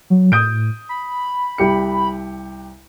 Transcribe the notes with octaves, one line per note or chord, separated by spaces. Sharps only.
F#3
A2 D#6 G6 D7
B5
C2 G4 C#7